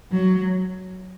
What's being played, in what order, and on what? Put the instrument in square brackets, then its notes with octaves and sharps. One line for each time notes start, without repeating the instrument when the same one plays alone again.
[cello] F#3